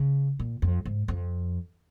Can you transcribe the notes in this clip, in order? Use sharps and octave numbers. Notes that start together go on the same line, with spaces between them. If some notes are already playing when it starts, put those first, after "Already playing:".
Already playing: C#3
A#2
F2
G#2
F2